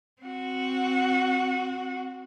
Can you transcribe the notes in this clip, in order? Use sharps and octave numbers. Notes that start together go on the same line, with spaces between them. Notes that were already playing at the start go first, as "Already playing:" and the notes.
C4 F#4